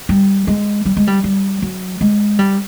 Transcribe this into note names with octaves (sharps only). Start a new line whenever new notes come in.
G3
G#3
G3
G#3
G3
G3
F#3
G#3
G3